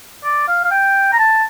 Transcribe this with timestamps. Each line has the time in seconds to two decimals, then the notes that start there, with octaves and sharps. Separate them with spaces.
0.24 D5
0.48 F5
0.64 F5
0.71 G5
1.13 A#5
1.19 A5